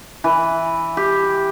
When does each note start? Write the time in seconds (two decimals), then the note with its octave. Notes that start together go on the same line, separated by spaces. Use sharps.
0.24 E3
0.97 G4